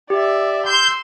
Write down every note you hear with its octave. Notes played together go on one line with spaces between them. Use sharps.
G4 D5 E5
C6 E6 G6